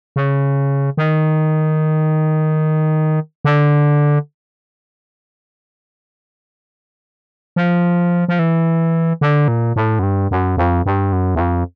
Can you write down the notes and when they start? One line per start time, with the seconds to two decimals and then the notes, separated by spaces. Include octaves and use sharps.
0.16 C#3
0.97 D#3
3.45 D3
7.56 F3
8.28 F3
8.39 E3
9.21 D3
9.48 A#2
9.76 A2
9.99 F#2
10.03 G2
10.31 F#2
10.57 F2
10.86 G2
11.13 F#2
11.35 E2
11.40 F2